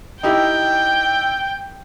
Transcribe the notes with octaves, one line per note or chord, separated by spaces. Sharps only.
D#4 E4 G4 G5